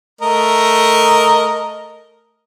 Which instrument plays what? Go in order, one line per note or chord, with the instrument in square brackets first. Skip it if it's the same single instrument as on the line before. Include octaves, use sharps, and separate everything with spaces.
[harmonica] A3 A#4 D#5